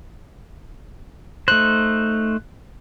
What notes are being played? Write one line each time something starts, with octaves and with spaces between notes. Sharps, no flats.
A3 D#4 C5 F#6